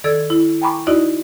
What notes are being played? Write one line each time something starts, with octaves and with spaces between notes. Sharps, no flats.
D#3 A4 D5 E6 G#6
E4
G5 G#5 A#5 B5 C#6 D6
D#4 E4 F#4 D5 D#5